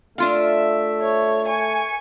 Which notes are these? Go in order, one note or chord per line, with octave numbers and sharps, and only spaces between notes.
A3 D4 F4 E5 F5
C#5
G#5 C#6 C#7